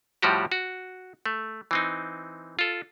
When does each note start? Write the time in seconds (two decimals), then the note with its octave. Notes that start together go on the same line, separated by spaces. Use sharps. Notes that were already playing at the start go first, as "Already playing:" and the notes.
0.22 A2 F3 G3 F#4 G4
0.52 F#4
1.26 A3
1.71 E3 C4 D#4
2.59 F4 A4